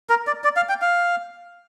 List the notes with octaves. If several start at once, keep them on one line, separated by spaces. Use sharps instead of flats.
A#4
D5
D5
F5
G5
F5